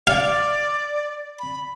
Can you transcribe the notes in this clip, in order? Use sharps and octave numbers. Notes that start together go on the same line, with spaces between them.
D5 F5
B5